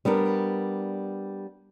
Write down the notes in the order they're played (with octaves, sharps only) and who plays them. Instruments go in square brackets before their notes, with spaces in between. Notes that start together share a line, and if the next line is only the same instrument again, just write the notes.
[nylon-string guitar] G3 B3 D4 A#4